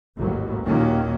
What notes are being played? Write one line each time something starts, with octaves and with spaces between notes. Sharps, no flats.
A1 D#2 G#2 F#3
D#2 A#2 D#3 F#3 A#3 C#4